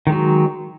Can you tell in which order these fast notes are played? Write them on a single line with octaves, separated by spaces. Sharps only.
D#3 G#3 F#3